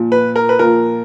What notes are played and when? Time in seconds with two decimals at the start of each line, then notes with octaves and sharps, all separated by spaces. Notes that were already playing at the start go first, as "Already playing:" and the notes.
Already playing: A#2 F3
0.12 B4
0.36 A#4
0.49 B4
0.59 A#2 F3 A#4